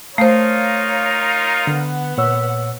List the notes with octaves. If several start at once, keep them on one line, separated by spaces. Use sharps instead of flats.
A3 D#4 F4 A#4 C5 C#5 F5
D3 B3 F#5
A#2 C#5 E6